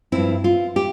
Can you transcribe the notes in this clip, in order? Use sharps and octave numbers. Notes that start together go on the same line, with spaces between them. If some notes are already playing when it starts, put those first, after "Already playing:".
G2 F3 C4 E4
F4
G4